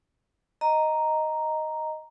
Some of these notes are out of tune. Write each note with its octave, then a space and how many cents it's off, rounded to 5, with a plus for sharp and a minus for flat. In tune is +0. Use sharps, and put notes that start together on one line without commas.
D#5 +0 A#5 +0